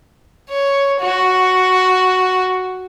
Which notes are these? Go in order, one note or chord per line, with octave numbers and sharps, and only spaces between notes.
C#5
F#4